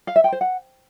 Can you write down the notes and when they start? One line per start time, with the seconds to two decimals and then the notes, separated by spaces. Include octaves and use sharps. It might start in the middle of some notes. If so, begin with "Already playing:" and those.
0.07 F5
0.16 E5
0.24 G5
0.32 C5
0.41 F#5